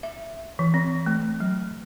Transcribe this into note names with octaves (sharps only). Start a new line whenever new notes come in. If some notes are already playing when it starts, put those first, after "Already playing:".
E5
E3
C4
A3
F#3